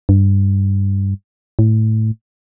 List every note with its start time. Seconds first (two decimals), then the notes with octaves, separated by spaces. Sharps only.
0.09 G2
1.59 A2